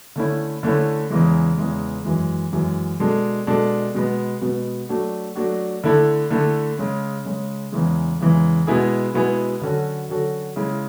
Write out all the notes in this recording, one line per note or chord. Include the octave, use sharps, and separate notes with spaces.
D3 A3 C#4 E4
D3 A3 C#4 E4
E2 C#3 E3 G#3
E2 C#3 E3 G#3
F#2 E3 G#3
F#2 E3 G#3
B2 G#3 D4 A4
B2 G#3 D4 A4
B2 G#3 B3
B2 G#3 B3
F#3 A3 D4 F#4
F#3 A3 D4 F#4
D3 A3 E4 A4
D3 A3 E4 A4
C#3 G#3 C#4
C#3 G#3 C#4
E2 C#3 E3 G#3
E2 C#3 E3 G#3
B2 G#3 B3 E4 G#4
B2 G#3 B3 E4 G#4
D3 F#3 C#4 F#4 A4
D3 F#3 C#4 F#4 A4
C#3 G#3 C#4 E4